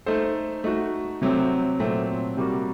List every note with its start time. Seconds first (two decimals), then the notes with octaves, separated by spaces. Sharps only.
0.06 A3 D#4 A4 C5
0.64 A3 D#4 F#4
1.22 C3 F#3 A3 C4
1.80 A#2 F#3 A3 C4
2.37 C3 G3 A#3 F#4